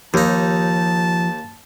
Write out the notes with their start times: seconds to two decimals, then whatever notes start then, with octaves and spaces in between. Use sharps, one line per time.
0.14 D#2 F3 D#4 G4 C#5 A5